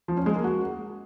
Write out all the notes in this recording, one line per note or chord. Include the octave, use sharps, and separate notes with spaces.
F3
C#4
G#3
A#3
F#4